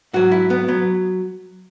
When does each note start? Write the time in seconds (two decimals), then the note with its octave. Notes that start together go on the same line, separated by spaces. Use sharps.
0.13 G#2 F#3 F#4
0.32 E4
0.50 B3
0.68 F#3 B3